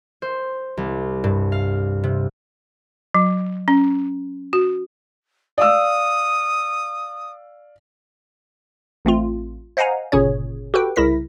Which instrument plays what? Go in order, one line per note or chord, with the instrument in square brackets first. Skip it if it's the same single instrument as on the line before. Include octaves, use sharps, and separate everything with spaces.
[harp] C5
C2
G2
F5
C3
[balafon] F#3
C#4
F#4
[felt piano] D5 F5 E6 [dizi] D#6
[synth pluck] A1 A3 C4 F4
C5 D#5 F5 F#5 G#5 A#5
G1 A#2 C#3 C#4 G#4 C#5
F#4 G4 A4 B4 G5
C2 C#3 E4 A#4 A#6 B6